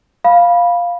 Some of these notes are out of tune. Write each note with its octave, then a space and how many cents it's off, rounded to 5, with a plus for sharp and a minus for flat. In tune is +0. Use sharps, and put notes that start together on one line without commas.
F5 +0 B5 -15